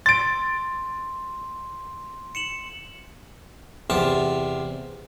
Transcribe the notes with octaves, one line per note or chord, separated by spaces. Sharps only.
C6 A6 D7
C#7 E7 F#7
E2 C3 A5